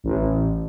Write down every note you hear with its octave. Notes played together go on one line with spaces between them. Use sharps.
A1